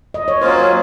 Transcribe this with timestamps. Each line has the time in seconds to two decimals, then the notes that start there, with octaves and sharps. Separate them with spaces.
0.14 D#5
0.28 C#5
0.41 F#3 A#3 C#4 F4 C5